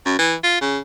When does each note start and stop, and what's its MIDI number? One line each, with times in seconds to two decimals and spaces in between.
0.06 0.18 42
0.19 0.35 52
0.44 0.60 65
0.61 0.79 49